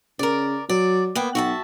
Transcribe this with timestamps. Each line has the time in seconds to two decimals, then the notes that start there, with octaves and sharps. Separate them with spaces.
0.19 C#3 A#4 D5
0.69 F#3 D5
1.15 A#3 B3 G5
1.35 B1 F#4 E5 A5